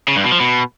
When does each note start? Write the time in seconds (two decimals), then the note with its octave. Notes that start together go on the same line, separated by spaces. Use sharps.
0.08 C#3
0.16 G2
0.24 B2
0.32 F3
0.40 B2